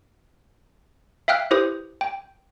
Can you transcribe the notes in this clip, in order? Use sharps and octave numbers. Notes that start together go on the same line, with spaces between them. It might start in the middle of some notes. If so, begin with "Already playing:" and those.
E5 F5 G5 F6 F#6
E4 G4 B4 C5 D#6
G5